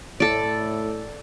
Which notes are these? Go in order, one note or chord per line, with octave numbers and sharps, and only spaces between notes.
A2 A4 D5